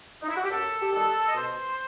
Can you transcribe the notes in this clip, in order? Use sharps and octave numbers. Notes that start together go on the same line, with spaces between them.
D#4
E4
F#4
G4
F#2 A4
G4
D#3 G3 B3 A4
D#5
B2 C5